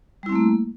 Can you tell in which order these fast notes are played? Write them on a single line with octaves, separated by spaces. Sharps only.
G3 E4 C4 A3 A#3